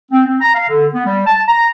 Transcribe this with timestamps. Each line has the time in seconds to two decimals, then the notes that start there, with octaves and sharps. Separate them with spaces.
0.11 C4
0.26 C4
0.41 A#5
0.55 F5
0.69 D3
0.94 B3
1.05 G3
1.26 A5
1.47 A#5